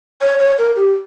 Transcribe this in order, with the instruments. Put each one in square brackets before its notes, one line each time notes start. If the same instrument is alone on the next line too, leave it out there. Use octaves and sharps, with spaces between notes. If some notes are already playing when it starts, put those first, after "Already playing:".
[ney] C#5
C#5
A#4
G4